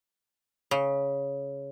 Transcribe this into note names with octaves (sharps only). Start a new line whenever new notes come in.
C#3